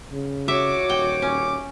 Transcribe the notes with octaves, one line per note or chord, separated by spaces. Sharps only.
C#3
F#4 C#5 E5 D6
D#1 G5
C#4